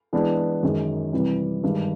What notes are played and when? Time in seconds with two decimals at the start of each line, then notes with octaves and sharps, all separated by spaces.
0.13 E3 G#3 B3 D4
0.63 F#2 D#3 G#3
1.13 C3 E3 G3
1.63 G2 D#3 G#3